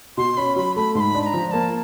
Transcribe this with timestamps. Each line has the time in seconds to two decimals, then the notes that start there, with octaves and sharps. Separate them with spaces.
0.17 B2 C6
0.37 C#4 B5
0.56 F#3 B5
0.76 A3 B5
0.95 G#2 C6
1.00 B5
1.14 D4
1.21 B5
1.26 A#5
1.34 F3
1.47 A#5
1.51 A#3 A5